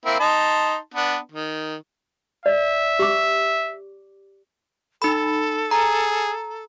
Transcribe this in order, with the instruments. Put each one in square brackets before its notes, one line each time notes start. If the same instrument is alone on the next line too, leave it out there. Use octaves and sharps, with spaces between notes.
[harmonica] A#3 C4 E4
D#4 A5 C6
B3 D4
D#3
[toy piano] D5 [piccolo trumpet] E5
[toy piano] G4 D6
[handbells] D#4 B5 [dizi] A4
[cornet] G#4 [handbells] A#5